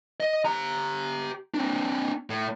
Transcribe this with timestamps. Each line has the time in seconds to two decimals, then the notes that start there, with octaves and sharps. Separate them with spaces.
0.20 D#5
0.45 G4 A#5
1.54 C4 D4
2.30 A2